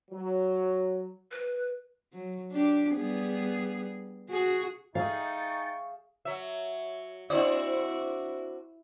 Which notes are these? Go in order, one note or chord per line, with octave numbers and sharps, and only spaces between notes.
F#3
B4
F#3
D4 G4
G3 B3 G#4
F#4 G#4
D#4 G#4 E5 F5 G5 G#5 C#6 A6
F#3 E5
C4 D4 E4 F#4 D5 D#5